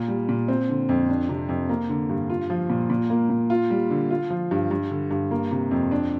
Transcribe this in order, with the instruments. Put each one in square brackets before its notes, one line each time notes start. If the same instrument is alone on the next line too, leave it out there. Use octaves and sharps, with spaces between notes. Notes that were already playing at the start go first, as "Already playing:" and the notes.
Already playing: [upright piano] A#2
G3
A#2
C4
D3
F2
D4
C3
F2
A#3
D3
G2
F4
F3
A#2
A#2
A#3
A#2
F4
G3
D3
F4
F3
G2
G2
D3
G2
A#3
C3
F2
D4